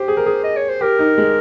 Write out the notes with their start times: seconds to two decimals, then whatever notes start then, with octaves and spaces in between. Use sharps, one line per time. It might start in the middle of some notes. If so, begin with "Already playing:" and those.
Already playing: G4 C5
0.08 G#4
0.17 A#4
0.26 G#4
0.44 D#5
0.56 C#5
0.69 C5
0.81 G4 A#4
0.99 D#4
1.18 G#3